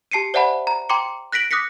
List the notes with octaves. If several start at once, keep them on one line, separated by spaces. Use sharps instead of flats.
G4 A5 C7 C#7 D#7
C5 D5 E5 F#5 A5 B5
A#5
G5 A#5 C6 D6 C#7
F#6 A#6 B6 D7 F#7
D6 D#6 F#6 A#6 B6 C#7